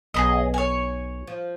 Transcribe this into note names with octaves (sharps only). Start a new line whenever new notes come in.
B1 G#4 B4 D#5
C#5 G#5
F3